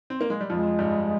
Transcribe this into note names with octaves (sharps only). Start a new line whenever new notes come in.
C4
A#3
G#3
G3
F2 F3 G#3
G2 G3